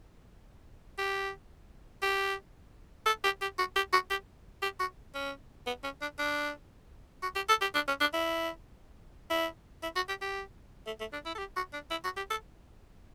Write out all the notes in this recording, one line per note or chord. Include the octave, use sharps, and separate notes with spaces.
G4
G4
A4
G4
G4
F#4
G4
F#4
G4
G4
F#4
C#4
B3
C#4
D4
D4
F#4
G4
A4
G4
D4
C#4
D4
E4
E4
E4
F#4
G4
G4
A3
A3
D4
E4
A4
G4
F#4
D4
E4
F#4
G4
A4